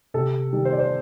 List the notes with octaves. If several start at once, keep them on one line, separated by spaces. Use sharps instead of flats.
C3 A4
D#3 G3
C5
D5
C5